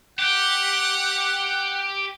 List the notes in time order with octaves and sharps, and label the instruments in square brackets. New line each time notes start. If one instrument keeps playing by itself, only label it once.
[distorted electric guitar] G4 [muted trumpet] F#5